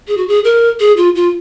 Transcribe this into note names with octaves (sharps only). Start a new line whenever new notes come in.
G#4
F#4
G#4
A#4
G#4
F4
F4